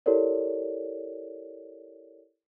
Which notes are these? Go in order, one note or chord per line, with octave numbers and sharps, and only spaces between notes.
E4 G4 A4 A#4 C#5 D5